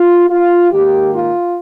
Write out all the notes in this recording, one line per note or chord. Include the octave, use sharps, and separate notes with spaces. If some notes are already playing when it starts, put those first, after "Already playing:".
Already playing: F4
F4
G#2 D#3 A#3 G4
F4